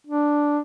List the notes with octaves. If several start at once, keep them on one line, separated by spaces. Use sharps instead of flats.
D4